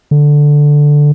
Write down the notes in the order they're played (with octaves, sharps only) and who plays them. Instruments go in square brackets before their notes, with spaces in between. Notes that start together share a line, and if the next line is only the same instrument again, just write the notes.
[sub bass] D3